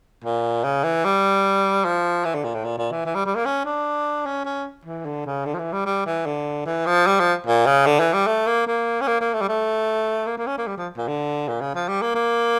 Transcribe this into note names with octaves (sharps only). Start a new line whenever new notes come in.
A#2
C#3
E3
G3
F3
E3
D3
A#2
A2
A#2
A#2
E3
E3
G3
G3
A#3
C#4
D4
C#4
C#4
E3
D3
C#3
D3
F3
E3
G3
G3
E3
D3
E3
F3
G3
F3
A#2
C#3
D3
E3
G3
A3
A#3
A#3
C#4
A#3
A#3
A3
G3
A3
A#3
A#3
C#4
A#3
G3
F3
A#2
D3
A#2
C#3
F3
G3
A#3
A#3